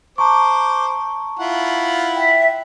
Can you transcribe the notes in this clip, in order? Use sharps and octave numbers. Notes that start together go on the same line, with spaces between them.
C5 A5 A#5 C#6 D6
E4 F4 F#5
E5 G5